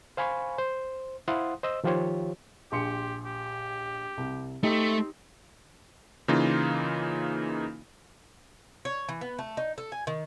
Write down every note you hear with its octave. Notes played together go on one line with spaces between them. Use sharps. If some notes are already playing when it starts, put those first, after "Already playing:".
C5 F5 G#5 B5 C#6
C5
E4 C5 F5 F#5 C6 D#6
C5 D#5 E6
D#3 F3 F4 G4 C5 C#5
A#1 G4 C6 C#7
G4
C2
A3 C4 D#4 G4
C#3 E3 A#3 D#4 F4
C#5
E3
B3
A3
D#4
A4
G#5
D#3